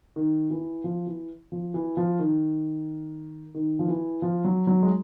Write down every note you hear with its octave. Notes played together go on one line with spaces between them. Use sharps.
D#3
E3
F3
E3
F3
E3
F3
D#3
D#3
F3
E3
F3
F#3
F#3
G#3